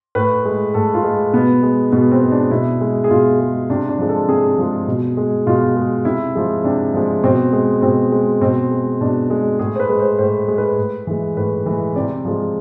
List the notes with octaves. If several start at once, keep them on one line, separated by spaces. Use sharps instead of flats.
A2 B4
G#3
A2 A4
F4
G#3
B2 B3
G#3
B2 B3
C4
G#3
D4
B2 E4
G#3
G#4
B2 F4
G#3
C3 D4
D4
F3 G#3
A4
C3 G#4
F3 G#3
B2
G#3
B2 F4
G#3
C3 E4
F3 G#3
C3 D4
F3 G#3
B2 C4
G#3
B2 C4
G#3
B2 C4
G#3
B2 D4
G#3
A2 G#4
C5
B4
G#3
C5
A2 C5
G#3
B4
A2
E3 G#3
A2 B4
E3 G#3
C3 D5
F3 G#3